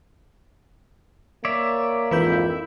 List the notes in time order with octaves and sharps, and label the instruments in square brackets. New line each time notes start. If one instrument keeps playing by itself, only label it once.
[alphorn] A#3 [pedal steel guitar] C#5 D5 E5
[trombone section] G#1 F2 [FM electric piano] E3 B4 G6 [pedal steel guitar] E4 E5